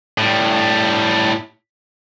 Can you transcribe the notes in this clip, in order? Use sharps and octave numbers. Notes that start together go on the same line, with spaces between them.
A2 G3